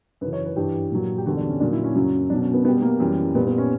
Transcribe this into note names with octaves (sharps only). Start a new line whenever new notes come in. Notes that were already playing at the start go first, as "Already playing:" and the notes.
F#2 C#3 E3 B4
C#5
B4
G2 E3 G3 G4
A#2 F#3
G4
E2 D3 G3 F#4
D4
C#4
A#2 F#3 D4
E4
C#4
F#2 C#3 F#3
B2 F#3 D4
C#4
B3
B2 G3 B3
A#3
F#2 E3 G3
A#2 G3 B3
B3
C#4